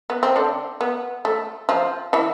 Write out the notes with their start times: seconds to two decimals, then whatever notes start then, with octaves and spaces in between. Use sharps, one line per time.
0.10 B3
0.23 C4
0.36 D3 D4
0.81 B3
1.25 A3
1.69 F3 F4
2.13 E3 E4